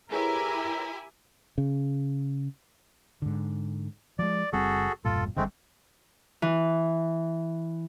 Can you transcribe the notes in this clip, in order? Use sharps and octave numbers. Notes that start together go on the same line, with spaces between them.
E4 G4 G#4 A#4 B4 C#5 G#5
C#3
G#2 D3
F3 G#3 D5
F#1 G3 C4 F#4 G#4 A4
E1 G2 A#2 F4 A4
G1 G2 D3 G#3 A3 C4
E3